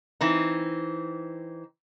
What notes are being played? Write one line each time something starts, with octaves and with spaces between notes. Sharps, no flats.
E3 C4 D#4